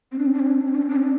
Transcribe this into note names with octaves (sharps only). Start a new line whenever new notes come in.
C4
D4
C4
D4
C4
D4
C4
D4
C4
D4
C4
D4
C4
D4